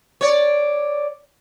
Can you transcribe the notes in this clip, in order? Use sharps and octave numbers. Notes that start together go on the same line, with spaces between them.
C#5 D5